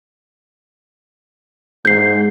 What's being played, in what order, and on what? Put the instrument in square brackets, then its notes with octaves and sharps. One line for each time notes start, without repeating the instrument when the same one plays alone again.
[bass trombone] G#2 [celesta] G6 C7